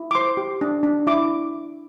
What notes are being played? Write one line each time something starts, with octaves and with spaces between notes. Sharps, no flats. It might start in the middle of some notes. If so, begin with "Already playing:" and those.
Already playing: E4
D6
C5 C6
G4
D4
D4
E4 D6